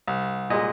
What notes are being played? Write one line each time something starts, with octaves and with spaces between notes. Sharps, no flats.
C2
A#2 G#3 D#5